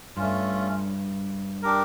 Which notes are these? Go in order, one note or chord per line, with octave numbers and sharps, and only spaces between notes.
G2 A3 C#4 F4
D4 G4 A#4